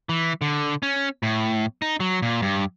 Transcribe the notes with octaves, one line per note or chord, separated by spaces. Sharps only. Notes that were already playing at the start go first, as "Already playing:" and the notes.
E3
D3
C#4
A2
D#4
F#3
A#2
G2